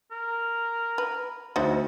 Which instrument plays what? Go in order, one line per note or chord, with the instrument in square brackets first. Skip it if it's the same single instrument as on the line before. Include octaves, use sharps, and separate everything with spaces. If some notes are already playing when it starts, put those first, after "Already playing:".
[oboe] A#4
[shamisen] B4
[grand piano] D2 A6 [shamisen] D#4 F#4 C5